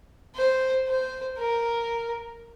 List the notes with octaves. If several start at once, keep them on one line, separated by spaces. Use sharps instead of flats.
C5
C5
A#4